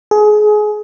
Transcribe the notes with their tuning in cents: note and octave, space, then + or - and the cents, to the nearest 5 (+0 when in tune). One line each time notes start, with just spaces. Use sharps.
G#4 +25